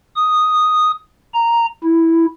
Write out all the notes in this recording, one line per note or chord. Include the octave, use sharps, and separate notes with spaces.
D#6
A#5
E4